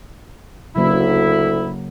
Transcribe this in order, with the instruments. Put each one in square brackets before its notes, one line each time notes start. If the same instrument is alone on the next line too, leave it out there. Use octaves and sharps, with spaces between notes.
[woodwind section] D2 E4 [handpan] C#3 F#3 A#3